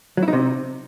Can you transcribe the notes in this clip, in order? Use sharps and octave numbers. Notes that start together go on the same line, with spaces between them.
F#3
E4
D#4
C3